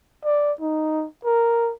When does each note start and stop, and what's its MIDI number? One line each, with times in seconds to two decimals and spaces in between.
0.25 0.52 74
0.60 1.06 63
1.25 1.72 70